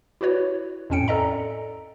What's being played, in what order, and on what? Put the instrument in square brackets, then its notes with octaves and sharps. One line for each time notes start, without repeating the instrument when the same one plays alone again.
[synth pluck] E4 F#4 B4 C#5
F2 A2 C#4 G5 C#7 D7
A4 D5 D#5 A#5